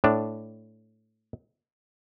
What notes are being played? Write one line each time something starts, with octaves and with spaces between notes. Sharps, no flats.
A2 D4